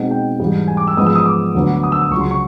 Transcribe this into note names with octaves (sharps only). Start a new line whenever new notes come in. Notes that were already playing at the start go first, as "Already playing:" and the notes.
Already playing: B2 G#3 C4 D#4 F#5
G5
G#2 E3 G3
G#5
D6
E6
G#2 F3 G#3 B3 D#6
E6
D#6
D6
D2 D3 F#3 B3
D#6
E6
D#6
C#2 C#3 F#3 C#6
C6
C#6